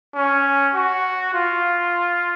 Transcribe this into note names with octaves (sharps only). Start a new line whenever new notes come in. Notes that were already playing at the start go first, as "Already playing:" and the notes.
C#4
F#4
F4